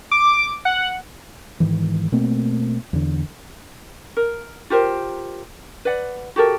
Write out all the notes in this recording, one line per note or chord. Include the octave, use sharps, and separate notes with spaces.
D6
F#5
G#2 D#3 E3
B2 A3 A#3 C4
E2 D3
A#4
F4 G4 A#4 C5
B4 D5 F#5
F#4 G4 A4 A#4